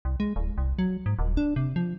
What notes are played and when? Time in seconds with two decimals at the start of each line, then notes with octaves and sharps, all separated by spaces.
0.05 C2
0.20 G#3
0.36 D1
0.58 C2
0.79 F#3
1.06 G#2
1.19 D#1
1.37 D4
1.56 C3
1.76 F3